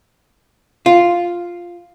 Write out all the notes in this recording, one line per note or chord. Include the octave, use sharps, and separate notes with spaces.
F4